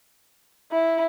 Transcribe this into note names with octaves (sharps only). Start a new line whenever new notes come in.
E4